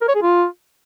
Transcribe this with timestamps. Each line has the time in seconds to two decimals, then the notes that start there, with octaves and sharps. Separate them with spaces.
0.01 A#4
0.08 C#5
0.15 G#4
0.22 F4